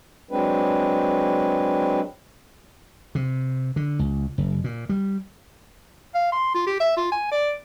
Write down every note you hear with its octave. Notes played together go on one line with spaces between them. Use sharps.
F#3 G#3 C4 D4 B4
C3
D3
C#2
F#1
A#2
G3
F5
C6
F4
G4
E5
F4
G#5
D5